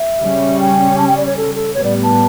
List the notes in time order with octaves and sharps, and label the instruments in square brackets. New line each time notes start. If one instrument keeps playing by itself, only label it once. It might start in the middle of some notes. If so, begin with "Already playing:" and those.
Already playing: [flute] E5
[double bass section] C#3 G3 C#4
[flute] G5
A5
G5
D5
C#5
A4
A4
[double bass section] A2 G3 B3 [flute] C#5
[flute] D5
A5